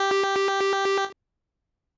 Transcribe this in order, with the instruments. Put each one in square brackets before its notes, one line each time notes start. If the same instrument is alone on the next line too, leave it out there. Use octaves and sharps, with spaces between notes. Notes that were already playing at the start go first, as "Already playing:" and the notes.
Already playing: [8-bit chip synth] G4